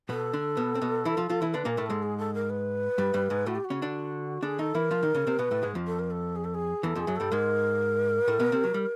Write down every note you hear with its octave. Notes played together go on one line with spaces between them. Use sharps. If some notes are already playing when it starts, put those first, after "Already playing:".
B2 B3 A4
D3 D4
B2 B3
C4
B2 B3
E3 E4
F3 F4
F3 F4
E3 E4
D3 D4 B4
A#2 A#3 A#4
A2 A3
G#2 G#3 A4
G#4
A4
A#4
B4
G2 G3
G2 G3
G#2 G#3
A2 A3 F#4
G4
F#4
C#3 C#4
D3 D4
D3 D4 G#4
D#3 D#4 A4
E3 E4 A#4
F3 F4
D#3 D#4
C#3 C#4
C3 C4
B2 B3 B4
A2 A3
G#2 G#3
F2 F3
A4
A#4
A4
G#4
A4
G#4
E2 E3 A4
F2 F3 G#4
F#2 F#3
G2 G3 A4
G#2 G#3 A#4
A2 A3
B2 B3
C3 C4
F#3
G3